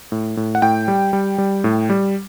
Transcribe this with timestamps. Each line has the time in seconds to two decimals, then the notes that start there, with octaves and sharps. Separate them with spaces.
0.12 A2
0.37 A2
0.55 F#5
0.62 A2 G5
0.88 G3
1.13 G3
1.38 G3
1.64 A2
1.90 G3